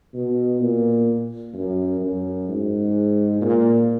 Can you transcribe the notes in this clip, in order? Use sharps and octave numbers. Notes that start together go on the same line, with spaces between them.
B2
A#2
F#2
F#2
G#2
A#2